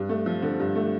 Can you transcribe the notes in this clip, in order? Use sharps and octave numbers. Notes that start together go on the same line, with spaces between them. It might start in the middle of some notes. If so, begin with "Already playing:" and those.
Already playing: G2
A3
F3
D3
G2
A3